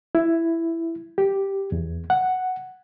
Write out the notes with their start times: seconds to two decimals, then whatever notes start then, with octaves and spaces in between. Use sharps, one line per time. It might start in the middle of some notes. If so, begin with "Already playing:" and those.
0.15 E4
1.18 G4
1.72 E2
2.10 F#5